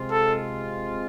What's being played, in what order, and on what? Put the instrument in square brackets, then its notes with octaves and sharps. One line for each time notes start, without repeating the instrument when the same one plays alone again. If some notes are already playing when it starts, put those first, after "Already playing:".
Already playing: [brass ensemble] C3 G#3 C4 F4
[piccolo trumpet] A4